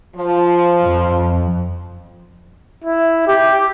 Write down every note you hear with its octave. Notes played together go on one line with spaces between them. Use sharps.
F3
F2
E4
G4